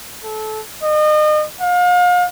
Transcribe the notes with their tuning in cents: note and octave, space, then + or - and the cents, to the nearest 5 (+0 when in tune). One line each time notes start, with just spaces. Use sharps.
A4 -25
D#5 -35
F5 +40